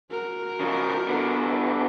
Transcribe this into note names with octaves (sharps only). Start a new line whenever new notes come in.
F#4 A#4
C#3 F3
D3 B3